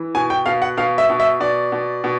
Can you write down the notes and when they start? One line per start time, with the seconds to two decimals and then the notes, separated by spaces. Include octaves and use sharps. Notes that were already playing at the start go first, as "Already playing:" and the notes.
Already playing: E3
0.15 B2 G#5
0.30 G5
0.46 B2 F5
0.62 F#5
0.77 B2 F5
0.98 E5
1.09 B2
1.20 E5
1.40 B2 D5
1.72 B2
2.04 B2